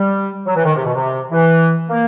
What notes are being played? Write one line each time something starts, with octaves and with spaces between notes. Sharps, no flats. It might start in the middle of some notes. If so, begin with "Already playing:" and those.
Already playing: G3
F#3
E3
D#3
C3
B2
C3
E3
A#3